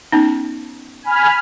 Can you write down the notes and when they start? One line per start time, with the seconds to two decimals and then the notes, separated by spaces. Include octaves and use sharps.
0.12 B3 C#4 D#4
1.03 G#5 B5 F6